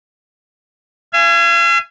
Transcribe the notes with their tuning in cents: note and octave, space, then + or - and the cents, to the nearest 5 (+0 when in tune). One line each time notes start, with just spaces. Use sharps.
F5 -45 G#5 +0